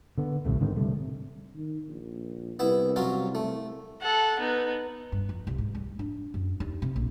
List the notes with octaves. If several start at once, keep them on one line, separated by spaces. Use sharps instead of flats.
D3 B3
B1 A2 C3 A3
G#2 D3 D#3 C4
C3 G3 A3
D#3
A#1
C2 B3 E4 E5
F#3 C#4 F4
A3
A4 F#5
B3 D#4
G2
F2
C2
G#2
G3
D4
F#2
D#2
C3
A#1